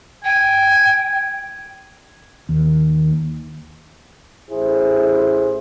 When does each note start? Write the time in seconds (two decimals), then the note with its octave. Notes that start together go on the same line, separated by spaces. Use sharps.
0.25 G5 G#5
2.49 D#2
4.51 A1 E4 G#4 C5